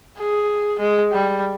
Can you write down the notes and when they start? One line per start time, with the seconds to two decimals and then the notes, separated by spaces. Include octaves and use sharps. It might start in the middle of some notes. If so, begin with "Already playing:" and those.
0.18 G#4
0.79 G#3
1.12 G3